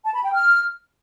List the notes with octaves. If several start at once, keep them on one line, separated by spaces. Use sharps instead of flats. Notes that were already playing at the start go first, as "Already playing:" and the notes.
A5
B5
G5
F6